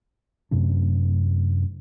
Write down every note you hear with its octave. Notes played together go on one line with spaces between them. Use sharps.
F#2 C3 A3 D4